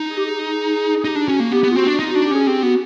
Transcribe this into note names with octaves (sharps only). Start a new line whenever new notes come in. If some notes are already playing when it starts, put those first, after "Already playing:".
Already playing: D#4
G#4
G4
G#4
G#4
D#4 G4
D4
C#4 F#4
A#3 F#4
B3 G4
B3
F4
C4 F#4
D4
D#4 F4
D4 F#4
G4
C#4 G#4
C4 G4
B3 F#4